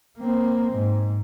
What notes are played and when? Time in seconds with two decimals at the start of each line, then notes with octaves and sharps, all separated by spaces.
0.18 A#3 C4
0.72 G#2